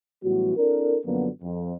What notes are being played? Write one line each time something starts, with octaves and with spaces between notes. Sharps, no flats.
A2 E3 F#3 G3 B3 F#4
C4 D4 E4 A4 A#4
F#2 D3 F3 F#3 A#3 B3
F2